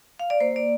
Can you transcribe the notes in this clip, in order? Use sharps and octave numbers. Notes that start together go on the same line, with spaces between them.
F5
D5
A#3 C5
D5